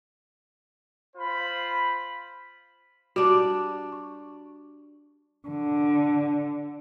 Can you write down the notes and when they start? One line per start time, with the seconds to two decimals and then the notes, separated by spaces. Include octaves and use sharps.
1.16 F4 C5 B5
3.16 G3 D4 F#4
3.92 C#6
5.48 D3